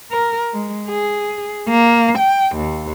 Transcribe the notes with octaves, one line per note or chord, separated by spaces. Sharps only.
A#4
G#3
G#4
A#3
G5
D#2